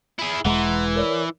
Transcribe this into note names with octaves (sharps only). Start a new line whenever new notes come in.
E4 G#4
E1 E3 G#3 F#5 A#5 C6
A#4 C#5 D5